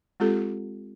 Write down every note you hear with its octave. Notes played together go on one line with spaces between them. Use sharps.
G#3 C4 F4 G4 A4